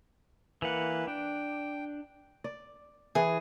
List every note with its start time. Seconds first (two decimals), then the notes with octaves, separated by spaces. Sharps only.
0.62 E3 A#3 B4 F#5
1.07 D4 G5
2.44 D5
3.15 E3 G#4